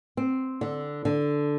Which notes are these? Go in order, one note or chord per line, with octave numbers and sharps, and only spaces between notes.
C4
D3
D3